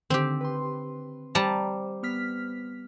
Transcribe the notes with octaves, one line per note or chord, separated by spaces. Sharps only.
D3 D#3 C4 G4
B4 C6
G3 C5 A5 A#5
B3 F6 B6